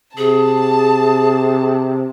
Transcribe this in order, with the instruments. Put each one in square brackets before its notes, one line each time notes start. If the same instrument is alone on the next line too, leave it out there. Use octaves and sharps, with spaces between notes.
[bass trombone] C3 [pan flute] G#4 [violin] A5